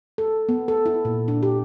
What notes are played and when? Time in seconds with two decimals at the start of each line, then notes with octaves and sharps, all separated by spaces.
0.18 A4
0.49 B3
0.68 A4
0.86 E4
1.05 A#2
1.28 D4
1.43 G4